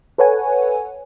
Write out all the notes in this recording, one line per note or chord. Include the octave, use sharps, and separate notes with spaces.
A4 B4 C#5 F#5 G#5